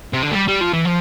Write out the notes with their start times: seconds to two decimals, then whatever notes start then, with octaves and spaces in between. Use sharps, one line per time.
0.13 C3
0.22 D3
0.31 A3
0.35 G3
0.48 G3
0.61 F3
0.73 E3
0.85 F3